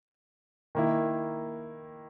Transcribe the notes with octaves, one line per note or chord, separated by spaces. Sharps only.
D#3 A#3 E4